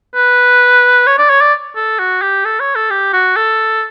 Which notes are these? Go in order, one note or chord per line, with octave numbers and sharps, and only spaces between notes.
B4
C#5
D5
C#5
D5
A4
F#4
G4
A4
C#5
A4
G4
F#4
A4